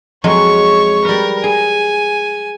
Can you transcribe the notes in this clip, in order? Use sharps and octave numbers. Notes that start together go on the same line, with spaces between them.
F2 F#3 G#3 C#5 C#6
G3 A#4 B4
G#4 G#5